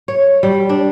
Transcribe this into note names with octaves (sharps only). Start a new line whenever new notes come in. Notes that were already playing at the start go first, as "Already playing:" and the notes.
C#5
G3
D4